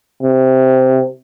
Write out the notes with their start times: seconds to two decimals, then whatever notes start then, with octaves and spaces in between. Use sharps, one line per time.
0.22 C3